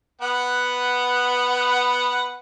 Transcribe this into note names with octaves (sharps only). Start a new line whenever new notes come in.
B3 B4 F#5